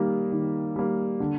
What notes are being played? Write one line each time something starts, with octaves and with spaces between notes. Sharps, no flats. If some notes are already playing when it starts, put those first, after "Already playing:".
Already playing: D#3 G3 A#3
D#3
G3 A#3
D3